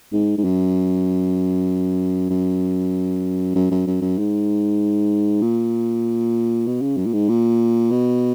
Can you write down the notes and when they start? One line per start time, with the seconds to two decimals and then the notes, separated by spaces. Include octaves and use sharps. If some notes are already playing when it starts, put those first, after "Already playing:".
0.12 G#2
0.38 G#2
0.44 F#2
2.30 F#2
3.55 F#2
3.71 F#2
3.87 F#2
4.01 F#2
4.18 G#2
5.42 A#2
6.67 B2
6.81 C#3
6.97 F#2
7.06 A#2
7.13 G#2
7.29 A#2
7.91 B2